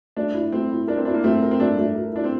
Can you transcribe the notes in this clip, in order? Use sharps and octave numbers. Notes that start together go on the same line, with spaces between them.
A3 D4
E4
A3 C4
E4
D4 A#4
C4
D4 E4
A#3
A3 C4
A#4
C4
A3 D4
A3
A#4
D4 E4
C4